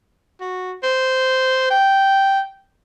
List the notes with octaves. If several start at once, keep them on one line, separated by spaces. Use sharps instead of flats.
F#4
C5
G5